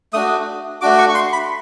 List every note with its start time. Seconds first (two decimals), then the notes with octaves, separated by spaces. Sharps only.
0.13 A3 D4 F#4 D#6
0.81 A3 D4 F#4 D6
0.98 C#6
1.09 C#6
1.15 C6
1.33 B5